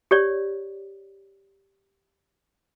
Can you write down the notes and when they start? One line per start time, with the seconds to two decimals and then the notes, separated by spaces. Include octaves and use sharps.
0.11 G4 C#5 D5